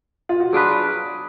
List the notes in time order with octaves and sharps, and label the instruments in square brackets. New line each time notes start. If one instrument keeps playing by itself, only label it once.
[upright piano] F4
F#4
[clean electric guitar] F#3 D4 F4 B4 [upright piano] G#4